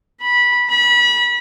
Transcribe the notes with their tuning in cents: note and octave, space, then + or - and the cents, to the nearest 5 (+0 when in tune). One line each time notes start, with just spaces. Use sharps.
B5 -15
B5 -30